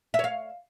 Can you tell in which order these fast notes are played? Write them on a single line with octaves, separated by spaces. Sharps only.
E5 C#5 F5